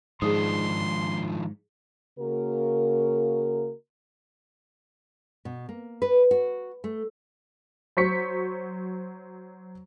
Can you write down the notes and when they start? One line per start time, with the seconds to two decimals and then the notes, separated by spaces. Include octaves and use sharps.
0.22 G#2 D#3 F3 D4 G#4 C6 D#6
2.19 C#3 A#3 F#4 A#4
5.45 B2
5.69 A#3
6.02 B4
6.31 F#4
6.84 A3
7.97 F#3 C5 C#6 B6 C#7